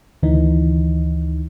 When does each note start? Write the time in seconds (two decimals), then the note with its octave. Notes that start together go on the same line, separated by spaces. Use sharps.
0.23 D2 D#3 E3 D#4